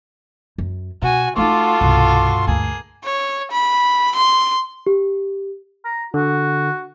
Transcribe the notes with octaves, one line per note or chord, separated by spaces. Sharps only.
F#2
B2 F#4 G#5
A3 D#4 F4 F#4 A4 C6 D6
C2 G2 B2
D2 A#3 G#4
C#5
B5
C6
G4
A#5
D3 F#4